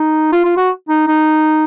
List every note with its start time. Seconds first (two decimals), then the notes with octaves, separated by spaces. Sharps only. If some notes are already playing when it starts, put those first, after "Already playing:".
Already playing: D#4
0.32 F4
0.45 F4
0.57 F#4
0.89 D#4
1.07 D#4